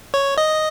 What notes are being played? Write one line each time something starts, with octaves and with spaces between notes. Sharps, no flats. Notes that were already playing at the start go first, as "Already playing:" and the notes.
C#5
D#5